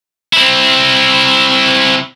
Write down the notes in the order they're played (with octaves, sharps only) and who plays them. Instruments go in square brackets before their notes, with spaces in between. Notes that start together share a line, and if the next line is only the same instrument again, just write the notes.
[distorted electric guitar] C4 E4